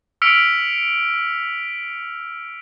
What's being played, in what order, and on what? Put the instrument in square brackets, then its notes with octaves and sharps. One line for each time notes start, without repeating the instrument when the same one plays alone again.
[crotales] E6 F6 B6 C#7 D7 F7